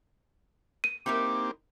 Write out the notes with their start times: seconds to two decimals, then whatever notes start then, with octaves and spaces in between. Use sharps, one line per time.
0.84 D#7
1.06 A#3 C4 D#4 E4 G4 A#4 D6